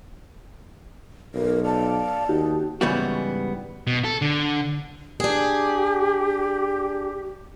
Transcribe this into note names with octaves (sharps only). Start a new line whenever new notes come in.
B1 A#4
D5 F5 A5
D#2 D#4 F#4 G4
G#2 C#3 E3 G3 B3 F#4
B2
A4
D3
D4 G4 G#4